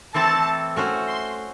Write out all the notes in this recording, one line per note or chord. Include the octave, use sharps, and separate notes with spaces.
E3 A3 C4 E4 A4 A5
A3 C#4 F#4 C5
C6